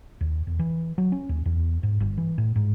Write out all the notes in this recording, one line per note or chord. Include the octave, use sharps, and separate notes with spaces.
D#2
E2
E3
F#3
C#4
D#2
E2
G#2
G1
E3
A2
G#2